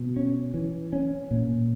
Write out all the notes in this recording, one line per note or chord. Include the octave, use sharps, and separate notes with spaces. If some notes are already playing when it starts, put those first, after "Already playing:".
Already playing: B2
C#4
E3
C#4
A#2